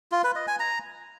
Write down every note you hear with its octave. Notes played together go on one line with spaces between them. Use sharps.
F4
B4
D#5
G#5
A#5